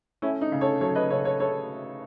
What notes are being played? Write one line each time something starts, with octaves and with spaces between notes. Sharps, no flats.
A3 C#4 E4
D#4
C#3
A4 C#5
F#3 A4 C#5
B4 D#5
C#3 A4 C#5
A4 C#5
A3 A4 C#5